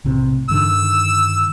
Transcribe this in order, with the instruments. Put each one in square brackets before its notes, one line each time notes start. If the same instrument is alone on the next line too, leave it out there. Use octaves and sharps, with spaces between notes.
[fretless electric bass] B1 A2 C3
[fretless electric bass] G2 D3 D#3 [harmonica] E6